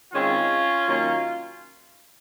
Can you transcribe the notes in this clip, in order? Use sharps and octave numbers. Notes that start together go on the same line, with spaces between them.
D#3 G#3 C4 C#4 F4
D#3 F#3 A#3 C#4